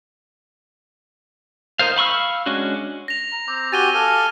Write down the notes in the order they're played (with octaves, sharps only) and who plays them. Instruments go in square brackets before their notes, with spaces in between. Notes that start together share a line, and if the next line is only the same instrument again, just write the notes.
[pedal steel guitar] D#4 A#4 C5 F5
F5 B5 C#6 E6 F6
G#3 C#4 D4 F#4
[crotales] A#6 F7
[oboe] A#5
[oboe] C4 [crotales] D6
[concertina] F#4 G4 G#5 [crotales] A6 D#7 G7
[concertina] A4 G#5 [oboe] F5